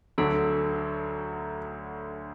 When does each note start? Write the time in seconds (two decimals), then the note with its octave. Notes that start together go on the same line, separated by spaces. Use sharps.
0.18 D2 D3 F#3 A4